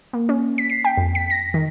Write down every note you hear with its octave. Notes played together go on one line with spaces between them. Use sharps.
A#3
C#4
B6
C7
G5
F2
B6
A#6
D#3